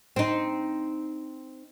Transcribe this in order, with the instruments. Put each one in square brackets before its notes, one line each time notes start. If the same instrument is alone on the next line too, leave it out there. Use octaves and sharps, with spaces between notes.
[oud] C4 D#4